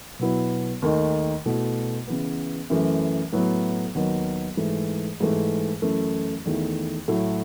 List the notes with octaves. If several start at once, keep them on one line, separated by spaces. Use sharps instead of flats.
B2 F#3 B3 E4
D#2 D#3 A3 D#4
B2 A3 E4
C#3 E3 B3
F#2 E3 A3
A2 F#3 B3 E4
D#2 D#3 F#3 B3 D#4
G#2 E3 A3
G#2 E3 A3
F#2 E3 A3 E4
E2 D#3 A3 E4
A2 F#3 A3 E4